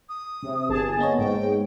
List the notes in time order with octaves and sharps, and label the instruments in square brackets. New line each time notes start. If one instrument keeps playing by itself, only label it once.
[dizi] D#6
[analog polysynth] C3
G1 G#4 A5
[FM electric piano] A#3 B3 C#5 [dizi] D#5
[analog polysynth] G#2 [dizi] G5